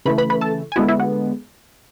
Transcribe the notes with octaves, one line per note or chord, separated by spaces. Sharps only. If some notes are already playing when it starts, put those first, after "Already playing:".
C#3 E3 A3 B4 B5
B4 B5
B4 B5
A4 A5
G#5
D3 G#3 B3 E4 F#4 F#5
E4 E5
F#4 F#5